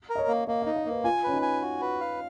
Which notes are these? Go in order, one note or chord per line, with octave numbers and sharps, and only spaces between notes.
A#4
D#5
C#5
A#3
A#3 D#5
F5
D#4
D#5
A#3 B4
F4 G#5
C#4 B4
D#4
G#5
F#4
B4
F5